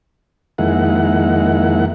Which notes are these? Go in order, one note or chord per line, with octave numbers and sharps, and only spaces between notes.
F2 D#3 G#3 A#3 E4 F#5